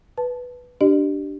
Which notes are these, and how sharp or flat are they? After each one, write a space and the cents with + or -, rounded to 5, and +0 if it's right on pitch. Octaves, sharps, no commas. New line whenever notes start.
B4 +0 A5 -10
D4 +0 G4 -20 D#5 -45